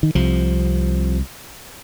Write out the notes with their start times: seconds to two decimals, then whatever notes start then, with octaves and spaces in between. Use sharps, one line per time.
0.03 D#3
0.15 C2 C3 F3